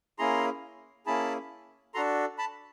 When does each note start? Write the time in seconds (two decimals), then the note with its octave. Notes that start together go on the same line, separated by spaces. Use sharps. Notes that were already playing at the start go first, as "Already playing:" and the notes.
0.19 A#3 C#4 E4 G#4 A#5 C6
1.06 A#3 C#4 E4 G#4 A5 B5
1.94 D4 F#4 A4 A#5 C6
2.38 A5 B5